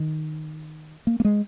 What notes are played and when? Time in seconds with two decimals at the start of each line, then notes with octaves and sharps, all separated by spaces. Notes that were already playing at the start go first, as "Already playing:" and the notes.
Already playing: D#3
1.07 A#3
1.20 A#3
1.25 G#3